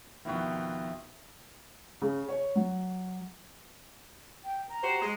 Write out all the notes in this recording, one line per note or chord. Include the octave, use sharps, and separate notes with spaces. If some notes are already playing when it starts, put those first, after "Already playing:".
F2 B2 D#3 E4 F#4
C#3
C#5
F#3
G5
A#5
F#4 G4 C5
G#3